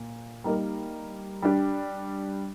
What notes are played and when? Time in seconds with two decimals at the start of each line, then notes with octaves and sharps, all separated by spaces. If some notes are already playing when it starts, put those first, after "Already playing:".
Already playing: A#2
0.44 G3 A#3 D#4 A#4
1.42 G3 D4 G4